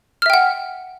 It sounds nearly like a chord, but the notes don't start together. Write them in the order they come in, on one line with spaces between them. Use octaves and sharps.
F6 E5 G5 F#5